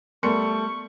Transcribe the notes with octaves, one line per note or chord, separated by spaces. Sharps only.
G3 A3 B3 A#4 C6 C#6 C#7